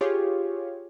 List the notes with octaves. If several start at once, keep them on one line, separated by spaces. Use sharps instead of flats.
F4 G4 G#4 C#5